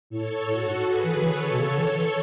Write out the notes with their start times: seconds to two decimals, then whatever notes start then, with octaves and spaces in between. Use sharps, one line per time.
0.10 A2 A4 C#5
0.47 A2 F#4 A4
0.66 G#2
0.84 G#4 B4
1.03 E3
1.15 D3
1.22 E3 A4 C#5
1.41 D3
1.51 B2
1.59 C#3 A4 C#5
1.72 D3
1.79 E3
1.97 E3